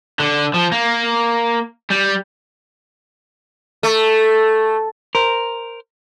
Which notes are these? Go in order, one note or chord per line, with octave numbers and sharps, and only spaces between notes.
D3
F3
A#3
G3
A3
A#4 C5